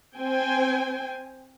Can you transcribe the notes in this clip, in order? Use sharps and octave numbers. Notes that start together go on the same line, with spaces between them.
C4 C5 G5 G#5